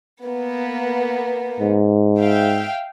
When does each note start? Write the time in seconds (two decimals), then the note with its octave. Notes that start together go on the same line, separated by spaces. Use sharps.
0.22 A#3 B3
1.60 G#2
2.20 E5 F5 G5